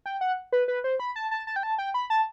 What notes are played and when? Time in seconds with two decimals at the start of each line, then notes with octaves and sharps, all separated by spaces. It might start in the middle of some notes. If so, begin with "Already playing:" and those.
0.06 G5
0.21 F#5
0.52 B4
0.68 B4
0.84 C5
1.00 B5
1.16 A5
1.31 A5
1.47 A5
1.56 G5
1.63 A5
1.78 G5
1.94 B5
2.10 A5